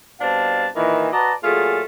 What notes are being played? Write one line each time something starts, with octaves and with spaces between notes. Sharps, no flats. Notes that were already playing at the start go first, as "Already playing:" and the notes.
B2 G3 C4 D4 F5 A5
A#2 D#3 E3
F#4 B4 D5 D#5 A5 A#5
A#2 F#3 A3 F4 G#4